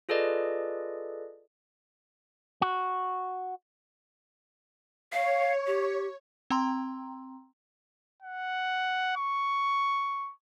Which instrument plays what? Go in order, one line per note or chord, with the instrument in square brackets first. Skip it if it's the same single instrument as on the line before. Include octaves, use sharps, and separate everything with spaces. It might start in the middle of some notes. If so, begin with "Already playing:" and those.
[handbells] F4 G#4 A4 B4 D5 D#5
[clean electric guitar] F#4
[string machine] C#5 [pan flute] F5
[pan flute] G4
[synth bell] C4 G5 A#5 C6
[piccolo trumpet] F#5
C#6